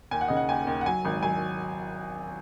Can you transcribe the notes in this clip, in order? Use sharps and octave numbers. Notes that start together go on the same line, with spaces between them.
D#2 G#5
F#5
C#3 D#5
F#5
D#2 G#5
D#2
F#5
F#3 G#5
G#1
F#3 G#5